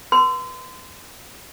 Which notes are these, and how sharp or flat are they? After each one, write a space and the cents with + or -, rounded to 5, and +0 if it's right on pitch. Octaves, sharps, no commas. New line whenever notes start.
B4 -35 C6 -30